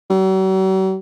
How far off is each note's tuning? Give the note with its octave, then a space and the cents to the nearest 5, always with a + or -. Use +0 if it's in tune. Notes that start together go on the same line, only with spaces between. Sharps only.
F#3 +45